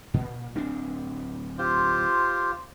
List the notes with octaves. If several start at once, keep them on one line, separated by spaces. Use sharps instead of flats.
A#2
D1 C4 D4
F4 G4 C5